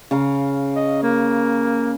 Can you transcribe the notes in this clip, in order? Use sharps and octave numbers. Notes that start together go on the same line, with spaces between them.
C#3 F5 A#5
D#5
A#3